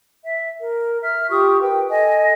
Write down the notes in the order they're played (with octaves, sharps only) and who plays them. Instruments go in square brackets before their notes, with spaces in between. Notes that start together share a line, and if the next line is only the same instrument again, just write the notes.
[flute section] E5
A#4
E5 F6
F4 G4 C#6 D#6
G4 A#4 B4 G5
A4 D#5 G#5